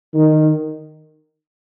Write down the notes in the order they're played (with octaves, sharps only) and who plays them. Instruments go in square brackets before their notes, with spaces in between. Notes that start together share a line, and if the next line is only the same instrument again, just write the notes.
[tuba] D#3